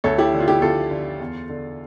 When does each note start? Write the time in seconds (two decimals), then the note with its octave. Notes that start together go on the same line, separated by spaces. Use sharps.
0.04 D2 A4 C#5
0.18 E4 G4
0.34 D3
0.40 F4
0.48 E4 G4
0.62 D2 F4 A4
0.91 D3
1.20 E2
1.49 D3